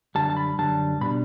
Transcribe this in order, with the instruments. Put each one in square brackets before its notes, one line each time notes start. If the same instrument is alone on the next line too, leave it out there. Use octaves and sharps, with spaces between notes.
[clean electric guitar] F#2 D3 G3 A5
A5
B5
F#2 D3 G3 A5
B2 G3 D4 B5